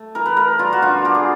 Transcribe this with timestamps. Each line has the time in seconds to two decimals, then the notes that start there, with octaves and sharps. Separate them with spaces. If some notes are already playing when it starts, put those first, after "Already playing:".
Already playing: A3
0.15 E3 A#4
0.26 B4
0.37 A3 A#4
0.59 G3 F4
0.73 F#4
0.82 D3 F4
1.05 B3 G4
1.15 G#4